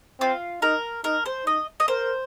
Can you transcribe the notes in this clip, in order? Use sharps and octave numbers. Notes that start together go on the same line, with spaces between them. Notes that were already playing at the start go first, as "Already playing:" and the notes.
C4 F4
D#4 A#4
D#4 A#4
C5
D#4 D#5
D#5
A#4 C5